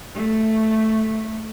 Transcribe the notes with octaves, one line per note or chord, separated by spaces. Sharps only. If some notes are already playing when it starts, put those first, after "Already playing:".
A3